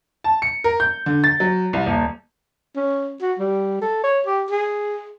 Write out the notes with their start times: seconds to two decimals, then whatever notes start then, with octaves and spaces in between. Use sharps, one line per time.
0.24 A5
0.42 C#7
0.64 A#4
0.80 G6
1.06 D3
1.24 A6
1.40 F#3
1.73 C2
1.86 D#1
2.76 C#4
3.22 F#4
3.39 G3
3.81 A4
4.03 C#5
4.25 G4
4.50 G#4